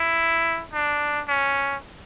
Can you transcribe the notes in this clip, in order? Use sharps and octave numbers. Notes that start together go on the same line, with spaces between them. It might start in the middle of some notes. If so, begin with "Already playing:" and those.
Already playing: E4
D4
C#4